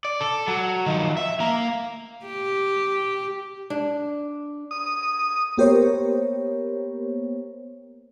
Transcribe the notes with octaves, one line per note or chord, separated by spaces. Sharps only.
D5
A4
F#3
D#3 F3
E5
A#3 A#5
G4
D4
D#6
A#3 B3 G4 A#4 C5 C#5